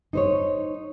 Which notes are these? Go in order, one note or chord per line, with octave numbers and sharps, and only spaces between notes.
D#4 C5 C#5